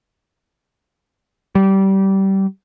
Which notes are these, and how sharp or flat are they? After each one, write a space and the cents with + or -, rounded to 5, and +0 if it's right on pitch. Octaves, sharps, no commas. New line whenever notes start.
G3 -20